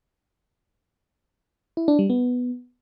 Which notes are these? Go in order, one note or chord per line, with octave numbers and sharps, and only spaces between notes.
E4
D4
G3
B3